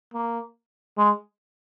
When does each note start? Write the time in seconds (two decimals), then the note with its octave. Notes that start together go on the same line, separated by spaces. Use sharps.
0.14 A#3
0.98 G#3